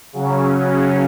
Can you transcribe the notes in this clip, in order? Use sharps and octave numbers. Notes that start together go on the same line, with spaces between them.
C#3 F#3 C#4